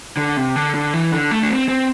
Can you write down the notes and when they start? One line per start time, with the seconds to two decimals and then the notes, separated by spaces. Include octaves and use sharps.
0.17 D3
0.37 C3
0.56 D3
0.74 D3
0.94 E3
1.12 D3
1.31 A3
1.42 D4
1.50 C4
1.69 C4